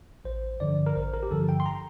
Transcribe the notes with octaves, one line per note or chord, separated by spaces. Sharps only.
A1 C5
G2 D3 F3 D5
A#4
A1 C5
A#4
G4
G2 D3 F3 A4
G5
C6
A#5